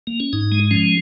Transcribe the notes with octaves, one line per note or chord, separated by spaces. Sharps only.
A#3
C#4
G#2 D#4
G#3
F3 C#4